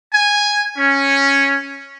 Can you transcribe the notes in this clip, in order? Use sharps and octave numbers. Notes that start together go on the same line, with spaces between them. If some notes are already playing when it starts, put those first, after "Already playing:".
G#5
C#4